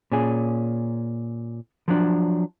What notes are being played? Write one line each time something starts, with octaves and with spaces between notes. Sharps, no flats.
A#2 C#4 G#4
F3 F#3 D4